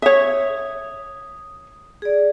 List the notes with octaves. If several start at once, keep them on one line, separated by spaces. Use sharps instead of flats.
C#5 E5 D#6
G#4 D5